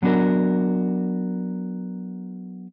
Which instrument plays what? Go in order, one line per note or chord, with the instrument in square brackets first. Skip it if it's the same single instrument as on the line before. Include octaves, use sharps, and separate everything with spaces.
[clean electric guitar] F#3 B3 D4 F#4 A#4